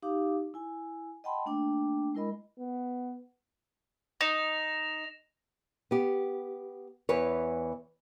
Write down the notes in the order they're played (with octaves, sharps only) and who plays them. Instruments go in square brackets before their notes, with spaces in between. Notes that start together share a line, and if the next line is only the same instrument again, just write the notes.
[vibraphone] D#4 G4 F5 D6
E4 G#5
D#5 F#5 G5 A5 B5 C6
A3 A#3 D4 G5 D6
G#3 E4 A#4 D#5 B5
[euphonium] B3
[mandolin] D#4 [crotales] A#6 E7 F7
[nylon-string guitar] B3 G4
E2 E3 B4 C#5